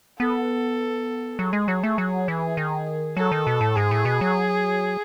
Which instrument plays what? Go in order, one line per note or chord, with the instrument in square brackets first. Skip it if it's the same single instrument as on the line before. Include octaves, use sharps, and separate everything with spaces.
[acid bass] B3 [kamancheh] A4
[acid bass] F#3 [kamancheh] G#4
[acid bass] G#3
F#3
A3
F#3
E3
D#3
[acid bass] F#3 [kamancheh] A4
[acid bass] D#3
B2
A2
[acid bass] G#2 [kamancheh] G#4
[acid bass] A2
B2
F#3